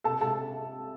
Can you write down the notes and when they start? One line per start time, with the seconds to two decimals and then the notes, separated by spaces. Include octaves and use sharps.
0.04 C3 A4 A5
0.21 C3 A4 A5